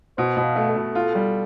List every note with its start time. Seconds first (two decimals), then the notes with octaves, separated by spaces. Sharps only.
0.17 B2 C5
0.37 B2
0.44 F5
0.56 A3
0.70 A4
0.76 B2
0.95 F4
1.15 G3